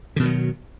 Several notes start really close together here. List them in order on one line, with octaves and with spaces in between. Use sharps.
D3 B2 D#3 F#3